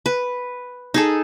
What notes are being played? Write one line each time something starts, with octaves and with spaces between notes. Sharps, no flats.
B4
D#4 G#4 A4